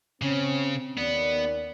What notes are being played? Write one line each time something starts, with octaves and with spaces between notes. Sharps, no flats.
C#3 C4 C#4
D#2 B3 D5